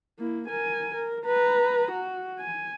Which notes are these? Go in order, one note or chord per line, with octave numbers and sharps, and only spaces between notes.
A#3 E4
A#4 G#5
A#4
B4 A#5
F#4
G#5